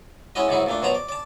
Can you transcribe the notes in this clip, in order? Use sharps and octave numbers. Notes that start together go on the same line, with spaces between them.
G#3 C#4 E4 F#4 D#5
G#2 C3 F#3 D#4 E4
A#2 A3 D4
B2 F#3 C5 A5 A#5
D5
D5 A5